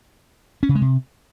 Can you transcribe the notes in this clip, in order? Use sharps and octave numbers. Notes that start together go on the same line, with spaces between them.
C#4
C#3
G#3
C3